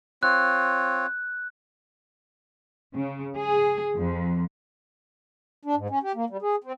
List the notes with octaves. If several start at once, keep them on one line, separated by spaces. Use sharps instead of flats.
C4 F4 C#5 F#6
C#3
G#4
F2
D4
G#2
C#4
G4
A#3
G3
G#4
C4